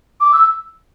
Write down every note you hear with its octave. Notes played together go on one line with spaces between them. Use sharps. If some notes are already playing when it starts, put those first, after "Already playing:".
D6
E6